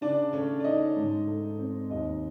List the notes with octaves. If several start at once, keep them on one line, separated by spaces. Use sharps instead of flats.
C#3 D4 D5
A3 C#4 C#5
D5
C#4 D#4 D#5
G#2
A3
C4
D#2 D#4 D#5